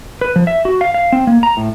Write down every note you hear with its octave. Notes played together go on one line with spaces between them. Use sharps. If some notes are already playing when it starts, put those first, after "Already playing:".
B4
F3
E5
F#4
F5
F5
C4
A#3
A#5
A2